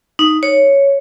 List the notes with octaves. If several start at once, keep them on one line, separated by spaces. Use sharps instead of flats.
D#4
C#5